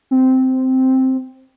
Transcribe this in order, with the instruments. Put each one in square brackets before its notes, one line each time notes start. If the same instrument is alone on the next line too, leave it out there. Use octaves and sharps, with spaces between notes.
[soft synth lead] C4